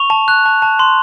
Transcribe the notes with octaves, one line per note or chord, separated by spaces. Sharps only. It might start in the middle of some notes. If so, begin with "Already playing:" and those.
Already playing: C#6 F7
A5
F#6
A5
A5
C6